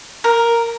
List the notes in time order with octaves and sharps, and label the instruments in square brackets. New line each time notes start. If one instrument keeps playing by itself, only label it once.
[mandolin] A#4